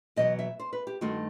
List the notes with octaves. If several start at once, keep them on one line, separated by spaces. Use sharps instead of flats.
E2 B2 F#3 D#5
E5
C5
B4
G4
G2 D#3 A3 C4 F#4